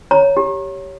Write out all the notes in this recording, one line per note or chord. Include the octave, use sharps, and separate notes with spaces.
C#5 A#5
G4